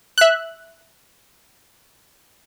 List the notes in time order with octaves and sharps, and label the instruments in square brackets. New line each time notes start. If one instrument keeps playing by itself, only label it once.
[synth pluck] E5 F#6